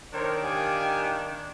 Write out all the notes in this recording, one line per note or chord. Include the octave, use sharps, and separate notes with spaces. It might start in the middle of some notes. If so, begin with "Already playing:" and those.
D#3 D4 A#4 C5 C#5
G4 F5 G#5